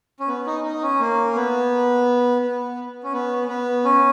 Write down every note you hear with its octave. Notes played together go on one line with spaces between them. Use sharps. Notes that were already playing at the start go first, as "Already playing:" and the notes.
C#4
B3
D#4
D#4
C#4
A#3
B3
B3
C#4
B3
B3
C#4